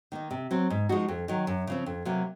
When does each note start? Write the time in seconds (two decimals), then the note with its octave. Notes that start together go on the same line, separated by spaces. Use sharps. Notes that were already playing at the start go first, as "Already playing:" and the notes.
0.12 D#3 A#3 D#4
0.31 C3
0.51 F#3 C4
0.70 G#2
0.89 F3 G#3 D#4 F#4
1.08 F2
1.28 D#3 F#3
1.47 F#2
1.67 C#3 F3 C4
1.86 F2
2.05 C3 F#3 A#3